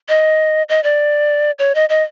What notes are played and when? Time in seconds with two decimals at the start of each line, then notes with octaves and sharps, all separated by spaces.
0.09 D#5
0.69 D#5
0.83 D5
1.59 C#5
1.75 D#5
1.89 D#5